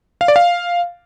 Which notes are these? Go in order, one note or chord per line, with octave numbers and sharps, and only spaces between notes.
F5
D5
F5